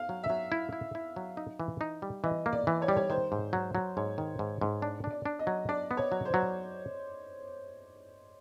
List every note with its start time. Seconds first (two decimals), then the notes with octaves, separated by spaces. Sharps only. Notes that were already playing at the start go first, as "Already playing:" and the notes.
Already playing: F5
0.09 F#3
0.23 E5
0.30 F#3
0.52 E4
0.73 E4
0.95 E4
1.16 F#3
1.37 D#4
1.60 E3
1.81 D#4
2.02 G3
2.23 E3 D#5
2.46 A#3
2.53 D5
2.67 E3
2.82 C#5
2.88 G3 D5
2.97 C#5
3.10 D#3 C5
3.32 G#2
3.53 F#3
3.75 F#3
3.97 G#2 C#5
4.18 D#3
4.39 G#2
4.61 G#2
4.82 D4 D5
5.04 D4
5.11 D5
5.26 D4
5.39 D#5
5.47 F#3
5.69 D4 D5
5.91 B3
5.97 C#5
6.12 F#3
6.25 C5
6.34 F#3